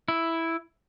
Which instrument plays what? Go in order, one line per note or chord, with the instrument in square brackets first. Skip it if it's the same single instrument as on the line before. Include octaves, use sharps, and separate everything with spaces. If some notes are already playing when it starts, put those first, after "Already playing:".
[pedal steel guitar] E4